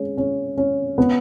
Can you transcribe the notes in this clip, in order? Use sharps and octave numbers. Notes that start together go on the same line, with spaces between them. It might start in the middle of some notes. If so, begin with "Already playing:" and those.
Already playing: G#3 C#4
C#4
C#4
B3